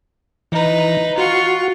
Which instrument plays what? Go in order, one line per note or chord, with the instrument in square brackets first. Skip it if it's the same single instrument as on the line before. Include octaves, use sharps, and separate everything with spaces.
[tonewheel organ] E3 [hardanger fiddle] D#4 B4
[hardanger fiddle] F4 C#6 [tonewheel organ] F#4